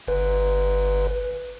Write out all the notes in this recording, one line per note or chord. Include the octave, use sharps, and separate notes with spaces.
G1 B4